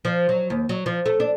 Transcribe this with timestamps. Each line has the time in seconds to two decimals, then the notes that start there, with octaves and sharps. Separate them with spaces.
0.05 F3
0.29 F#3
0.50 D#2
0.69 F#3
0.86 F3
1.06 A3
1.20 D4